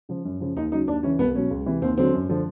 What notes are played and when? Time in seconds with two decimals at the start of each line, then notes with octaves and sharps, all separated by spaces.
0.09 C#3 F3
0.25 F#2
0.40 C#3 F3
0.56 D#2 D#4
0.72 C#3 F#3 D#4
0.88 D#2 D4
1.03 C#3 E3 C#4
1.19 C2 B3
1.35 B2 F#3 C#4
1.50 C#2
1.66 C3 E3
1.82 D#2 C4
1.98 D3 F#3 C4
2.14 F#2
2.29 D3 F3